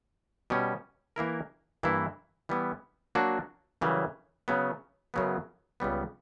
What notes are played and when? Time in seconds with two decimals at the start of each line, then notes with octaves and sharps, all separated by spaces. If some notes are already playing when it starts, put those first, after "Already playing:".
0.50 B2 G3 C#4
1.16 E3 A#3 E4 A#4
1.83 G2 E3 A#3 E4
2.49 E3 G3 B3 E4
3.15 F#3 A#3 D4 F#4
3.81 F#2 C#3 E3 G3
4.48 C#3 F#3 B3
5.14 F#2 C#3 F#3 B3
5.80 C#2 C#3 G3 B3